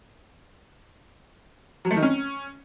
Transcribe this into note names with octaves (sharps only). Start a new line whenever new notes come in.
F#3
A3
D#3
C#4